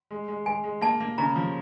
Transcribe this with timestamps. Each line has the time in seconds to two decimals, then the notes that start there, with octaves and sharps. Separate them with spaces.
0.11 G#3
0.28 G#3
0.46 G#3 G#5
0.64 G#3
0.81 A#3 A5
1.00 A#3
1.18 C#3 A#5
1.36 F3